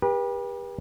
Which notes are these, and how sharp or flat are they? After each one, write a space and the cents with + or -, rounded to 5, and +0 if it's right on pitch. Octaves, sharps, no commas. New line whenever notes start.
G4 +30 B4 -40